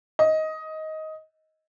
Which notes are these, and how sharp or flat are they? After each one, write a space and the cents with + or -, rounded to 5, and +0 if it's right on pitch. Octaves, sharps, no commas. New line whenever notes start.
D#5 +15